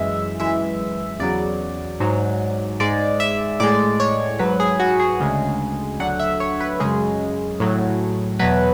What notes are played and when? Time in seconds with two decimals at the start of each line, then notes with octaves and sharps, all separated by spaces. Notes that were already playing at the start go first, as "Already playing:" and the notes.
Already playing: F#2 E3 G#3 E5
0.39 F#2 E3 G#3 E5
1.20 E2 C#3 F#3 D5
2.00 G#2 F#3
2.80 G#2 G#3 D5
3.20 E5
3.60 A2 G#3 D5
4.00 C#5
4.39 G#2 F#3 B4
4.60 G#4
4.80 F#4
5.00 G#4
5.20 D2 C#3 G#3
6.00 D2 D3 F#3 F#5
6.19 E5
6.40 C#5
6.60 B4
6.80 F#2 C#3 G#3 G#4
7.60 A2 F#3
8.39 E2 B2 F#3 B4